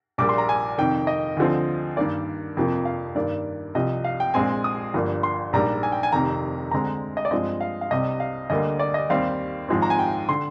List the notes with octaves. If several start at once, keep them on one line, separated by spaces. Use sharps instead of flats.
A#1 A#2 G3 A#3 D6
C6
A#5
G#5
F2 C3 D#3 G5
D#5
D2 D3 F3 C4
G2 D#3 A#3 D5
F2 C3 F3 A#3
F5
G2 D#3 A#3 D5
C2 C3 F3 D#5
F5
G5
A#1 A#2 G#3 C4 G#5
D#6
G1 G2 F3 A#3
C6
A#1 G#2 G3 A#3 A#5
G#5
G5
G#5
F1 F2 C3 D#3 A#5
D2 D3 G#3 C4 A#5
D#5
D5
G2 F3 G#3 C4 D#5
F5
F5
C2 C3 G3 C4 D#5
F5
D2 D3 G3 A#3 D#5
D5
D#5
D#2 D#3 G3 C4 F5
G#1 G#2 F3 G#3 C4
A#5
G#5
G5
D3 C6